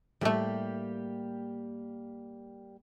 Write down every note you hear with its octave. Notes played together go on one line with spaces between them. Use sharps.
A2 G3 A3 A#3 G4